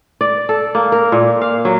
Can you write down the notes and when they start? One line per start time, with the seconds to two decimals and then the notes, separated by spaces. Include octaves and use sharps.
0.21 D5
0.49 A4
0.75 A#3
0.92 A#4
1.12 A#2
1.41 F5
1.65 F#3